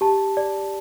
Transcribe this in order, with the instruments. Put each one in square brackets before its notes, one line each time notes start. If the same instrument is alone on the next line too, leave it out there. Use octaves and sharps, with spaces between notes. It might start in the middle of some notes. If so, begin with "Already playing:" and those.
[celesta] G4 A5
D5